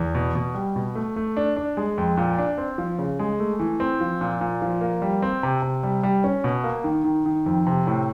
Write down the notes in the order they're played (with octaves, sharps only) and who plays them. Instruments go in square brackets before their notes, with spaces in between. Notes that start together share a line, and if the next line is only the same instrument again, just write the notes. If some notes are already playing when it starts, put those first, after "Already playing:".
Already playing: [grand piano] E2
B2
B2
G3
B2
A3
A3
D4
D4
G#3
F2
A#2
D4
C4
F3
C#3
G#3
A3
E3
C4
F3
A#2
A#2
F3
A#3
G3
C4
C3
C3
G3
G3
C#4
B2
A#3
D#3
D#3
D#3
F2
C3
A2